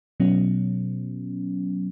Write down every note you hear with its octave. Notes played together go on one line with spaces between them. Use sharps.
B2 F#3 B3 C#4